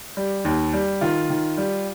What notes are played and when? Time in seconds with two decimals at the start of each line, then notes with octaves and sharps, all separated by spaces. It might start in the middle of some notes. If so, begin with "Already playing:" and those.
0.17 G3
0.45 D#2
0.73 G3
1.01 D#3 F4
1.30 D#3
1.57 G3